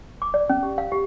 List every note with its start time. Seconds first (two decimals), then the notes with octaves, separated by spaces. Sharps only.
0.22 D6
0.34 D5
0.49 C#4
0.63 G4
0.78 F5
0.92 G4